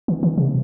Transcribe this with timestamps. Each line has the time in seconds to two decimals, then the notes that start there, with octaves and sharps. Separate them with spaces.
0.08 D#3
0.23 D#3
0.38 C3